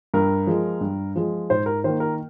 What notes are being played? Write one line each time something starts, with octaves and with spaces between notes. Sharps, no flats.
G2 A#4
F3 G#3
G2
F3 G#3
G#2 C5
A#4
D#3 A#3 C5
A#4